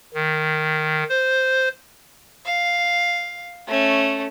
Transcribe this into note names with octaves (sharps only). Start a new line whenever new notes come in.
D#3
C5
F5
A3 C#4